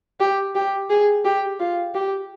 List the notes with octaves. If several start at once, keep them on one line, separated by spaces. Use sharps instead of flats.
G4
G4
G#4
G4
F4
G4